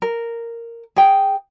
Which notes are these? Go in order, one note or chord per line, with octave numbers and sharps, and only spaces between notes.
A#4
G#4 G5